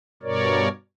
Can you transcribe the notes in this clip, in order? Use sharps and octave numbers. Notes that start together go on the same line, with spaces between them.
G2 B2 A#4 C#5 D5